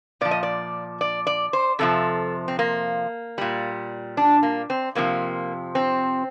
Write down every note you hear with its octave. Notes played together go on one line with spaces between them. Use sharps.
A#2 F3 D5
D#5
D5
D5
D5
C5
F2 C3 F3 A4
C4
A#3
A#2 G3
D4
A#3
C4
F2 C3 F3 A#3
C4